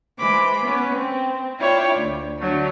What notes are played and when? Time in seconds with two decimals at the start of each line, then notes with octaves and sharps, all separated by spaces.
0.17 E3 G#3 C5 B5 D6
0.62 B3 C#4 B4
0.91 C4
1.57 E4 F4 C#5 D5 G5
1.95 D2
2.38 D3 F#3 A3